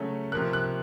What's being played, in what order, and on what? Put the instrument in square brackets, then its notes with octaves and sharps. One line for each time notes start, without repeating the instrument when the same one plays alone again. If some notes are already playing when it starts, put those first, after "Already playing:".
Already playing: [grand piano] C#3 F#3 A3 C#4
A#3 F#6
C3 F3
F#6